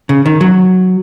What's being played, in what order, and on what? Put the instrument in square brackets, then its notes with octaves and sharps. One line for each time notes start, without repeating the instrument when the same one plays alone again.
[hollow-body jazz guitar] C#3
D#3
F#3